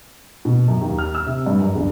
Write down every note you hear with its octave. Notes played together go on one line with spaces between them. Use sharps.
B2
F#2
D#2
F6
E6
C3
G2
F#2
G1